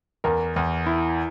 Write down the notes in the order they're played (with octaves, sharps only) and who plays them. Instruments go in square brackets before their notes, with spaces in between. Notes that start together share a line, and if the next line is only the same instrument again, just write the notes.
[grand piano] E2 [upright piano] A#4
[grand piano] E2
E4